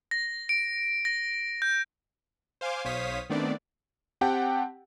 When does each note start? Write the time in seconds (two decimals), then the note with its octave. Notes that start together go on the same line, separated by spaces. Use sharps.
0.11 A#6
0.49 D7
1.05 A#6
1.62 G6
2.61 C5 F5 G#5 C6 D6
2.85 B1 C5 C#5 F5 D#6 B6
3.30 D#3 A3 B3 C4 D4 D5
4.21 C4 G4 F#5 G5 A5